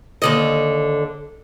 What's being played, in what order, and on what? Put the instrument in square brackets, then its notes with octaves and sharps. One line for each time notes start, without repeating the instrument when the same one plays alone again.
[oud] D#2 D3 D#5